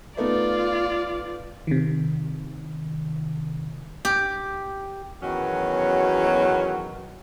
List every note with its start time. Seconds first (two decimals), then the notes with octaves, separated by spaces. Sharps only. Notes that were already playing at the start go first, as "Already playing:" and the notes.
0.17 A3 B3 D#4 F4 D5
1.67 C3 D#3
4.05 G4
5.21 E2 B2 D#3 F#3 C#4